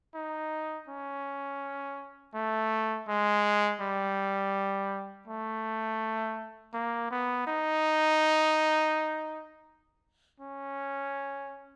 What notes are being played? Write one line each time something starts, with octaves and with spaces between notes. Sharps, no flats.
D#4
C#4
A3
G#3
G3
A3
A#3
B3
D#4
C#4